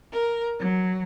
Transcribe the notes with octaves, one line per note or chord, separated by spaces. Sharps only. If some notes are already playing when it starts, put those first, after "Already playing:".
A#4
F#3